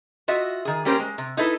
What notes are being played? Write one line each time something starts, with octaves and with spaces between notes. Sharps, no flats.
F4 F#4 D#5 E5
D#3 G#4
G3 A#3 C#4 G4 A#4 C5
G#3
C3
D#4 E4 A4 B4